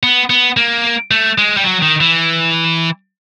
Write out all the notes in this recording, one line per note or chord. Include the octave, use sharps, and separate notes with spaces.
B3
B3
A#3
A3
G#3
G3
F#3
D#3
E3